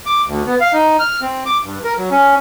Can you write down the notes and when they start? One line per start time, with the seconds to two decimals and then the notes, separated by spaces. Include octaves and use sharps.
0.06 D6
0.27 D2
0.46 B3
0.61 F5
0.73 D#4
1.00 F6
1.22 C4
1.46 D6
1.63 G2
1.84 A#4
1.98 F#3
2.11 C#4